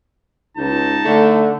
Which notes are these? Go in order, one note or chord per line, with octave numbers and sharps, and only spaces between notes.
C#2 D#4 A5
D3 A3